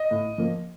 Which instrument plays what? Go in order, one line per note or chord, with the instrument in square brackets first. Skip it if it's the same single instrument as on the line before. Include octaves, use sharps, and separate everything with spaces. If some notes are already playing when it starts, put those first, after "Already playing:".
Already playing: [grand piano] D#5
[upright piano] A2
F3 A#3